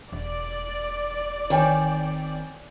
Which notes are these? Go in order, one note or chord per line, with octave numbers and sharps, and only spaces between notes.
E1 D5
D#3 C4 C#5 G5 G#5